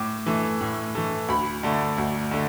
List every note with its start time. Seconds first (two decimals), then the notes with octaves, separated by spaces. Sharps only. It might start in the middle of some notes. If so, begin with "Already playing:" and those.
Already playing: A2 D6
0.26 E3 A3
0.61 A2
0.95 E3 A3
1.29 D2 B5
1.63 D3 A3
1.98 D2
2.31 D3 A3